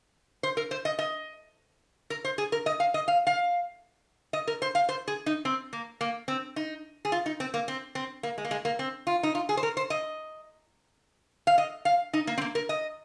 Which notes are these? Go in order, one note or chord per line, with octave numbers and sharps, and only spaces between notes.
C5
A#4
C5
D#5
D#5
A#4
C5
G#4
A#4
D#5
F5
D#5
F5
F5
D#5
A#4
C5
F5
C5
G#4
D#4
C4
A#3
A#3
C4
D#4
G#4
F4
D#4
C4
A#3
C4
C4
A#3
G#3
A#3
G#3
A#3
C4
F4
D#4
F4
G#4
C5
A#4
C5
D#5
F5
D#5
F5
D#4
A#3
C4
A#3
A#4
D#5